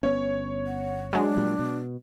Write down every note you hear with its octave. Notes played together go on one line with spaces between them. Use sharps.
G1 B3 C#4 C#5
F#5
F#3 G#3 D4
A#2 G3
B2